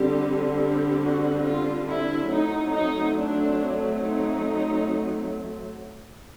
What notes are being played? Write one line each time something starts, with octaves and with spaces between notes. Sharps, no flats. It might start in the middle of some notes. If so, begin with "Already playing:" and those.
Already playing: D3 G3 C4 G4
G4
F#4
F4
E4
F#3 A3 C4 D#4
D#4
D4
D#4